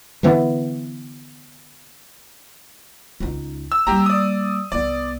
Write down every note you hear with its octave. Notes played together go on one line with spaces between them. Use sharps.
D3 E3 B3
C#2 D#4
E6
G3 A#3 G4 A#5
D5 D#6
C2 B3 D5